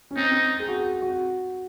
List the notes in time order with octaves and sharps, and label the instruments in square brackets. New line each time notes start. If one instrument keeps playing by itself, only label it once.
[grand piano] C#4
[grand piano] C4 [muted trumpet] D#4
[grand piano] C4
G#4
F#4
G#4
F#4